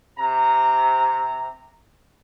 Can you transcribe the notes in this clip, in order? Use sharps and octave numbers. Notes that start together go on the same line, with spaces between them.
C3 A#5